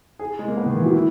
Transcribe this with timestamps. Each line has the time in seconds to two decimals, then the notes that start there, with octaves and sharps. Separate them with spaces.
0.19 G#4
0.39 G#3
0.48 A#3
0.57 B3
0.66 D#3
0.76 E3
0.85 F#3
0.94 E4